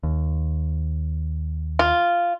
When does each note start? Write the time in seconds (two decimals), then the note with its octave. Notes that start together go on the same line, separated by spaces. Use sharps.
0.03 D#2
1.79 F4